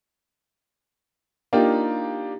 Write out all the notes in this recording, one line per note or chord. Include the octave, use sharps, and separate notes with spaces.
A#3 D4 D#4 F4 G4